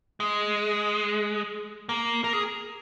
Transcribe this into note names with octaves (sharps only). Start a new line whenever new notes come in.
G#3
A#3
A#4
G#4